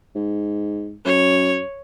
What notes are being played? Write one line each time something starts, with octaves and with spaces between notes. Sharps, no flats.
G#2
F#2 C#5